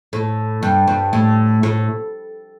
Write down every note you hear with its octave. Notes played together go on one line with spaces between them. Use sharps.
A2
G2
G2
A2
A2